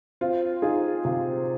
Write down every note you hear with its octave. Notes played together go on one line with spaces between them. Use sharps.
C4 F4
D#4 F4 G#4
C3 F4